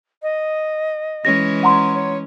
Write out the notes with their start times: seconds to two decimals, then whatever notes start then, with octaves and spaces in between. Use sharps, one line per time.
0.22 D#5
1.25 E3 G#3 C#4 A#6
1.63 F#5 A#5 C6
1.93 C#5